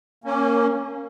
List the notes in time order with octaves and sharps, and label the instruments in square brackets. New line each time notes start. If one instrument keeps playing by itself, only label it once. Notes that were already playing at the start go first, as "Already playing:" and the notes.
[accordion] A#3 C#4